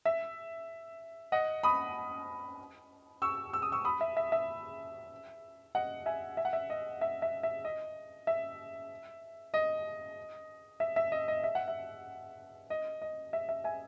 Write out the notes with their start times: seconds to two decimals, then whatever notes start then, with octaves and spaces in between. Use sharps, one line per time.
0.05 E5
1.32 D#5 F#5
1.63 B5 D#6
3.22 C#6 E6
3.53 E6
3.62 D#6
3.72 C#6 E6
3.85 B5 D#6
4.01 E5
4.17 E5
4.32 E5
5.75 D#5 F#5
6.06 E5 G#5
6.37 E5
6.45 F#5
6.53 E5
6.70 D#5
7.01 E5
7.22 E5
7.43 E5
7.65 D#5
8.27 E5
9.54 D#5
10.80 E5
10.96 E5
11.12 D#5
11.28 D#5
11.44 E5
11.55 F#5
11.68 E5
12.70 D#5
13.02 D#5
13.33 E5
13.49 E5
13.64 E5 G#5